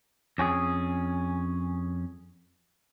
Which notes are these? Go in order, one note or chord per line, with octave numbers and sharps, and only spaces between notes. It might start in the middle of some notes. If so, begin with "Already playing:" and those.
F2 C#4 F#4 G#4